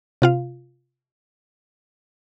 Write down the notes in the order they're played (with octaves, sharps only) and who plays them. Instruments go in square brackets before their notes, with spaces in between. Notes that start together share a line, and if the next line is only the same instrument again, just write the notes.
[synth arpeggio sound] C3 F4 F5